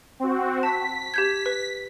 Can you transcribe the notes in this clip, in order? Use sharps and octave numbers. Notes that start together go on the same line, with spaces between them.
C4 F#4
A5 B6
G4 G6 G#6
B4